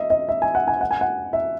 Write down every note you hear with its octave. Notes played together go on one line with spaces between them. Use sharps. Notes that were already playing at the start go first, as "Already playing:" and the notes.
Already playing: D#5 E5
D#5
E5
G#5
F#5
G#5
F#5
G#5
F#5
E5